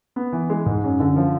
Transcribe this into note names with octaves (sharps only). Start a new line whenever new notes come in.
B3
E3
G#3
G#2
F#2
D3
F3